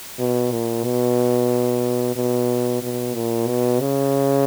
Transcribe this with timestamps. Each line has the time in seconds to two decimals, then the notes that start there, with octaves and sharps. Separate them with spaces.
0.19 B2
0.52 A#2
0.85 B2
2.16 B2
2.82 B2
3.15 A#2
3.48 B2
3.81 C#3